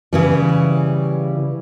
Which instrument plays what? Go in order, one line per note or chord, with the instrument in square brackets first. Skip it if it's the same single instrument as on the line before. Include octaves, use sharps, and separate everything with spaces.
[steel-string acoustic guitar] C#3 E3 G3